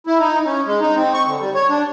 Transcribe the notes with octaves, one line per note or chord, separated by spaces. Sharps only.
E4
D#4
C#4
G#3
D#4
C4
C#6
D3
G3
C#5
D4